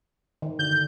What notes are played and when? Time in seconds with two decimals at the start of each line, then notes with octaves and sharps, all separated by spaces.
0.42 D#3
0.59 D3 G6